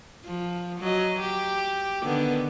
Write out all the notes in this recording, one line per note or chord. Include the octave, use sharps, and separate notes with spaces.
F3
F#3 D#5
G4
D3 D#3 B3